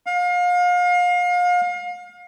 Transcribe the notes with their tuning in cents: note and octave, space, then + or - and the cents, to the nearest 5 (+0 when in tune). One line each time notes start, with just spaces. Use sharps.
F5 +35